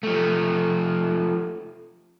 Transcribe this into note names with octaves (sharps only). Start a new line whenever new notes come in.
F3 A3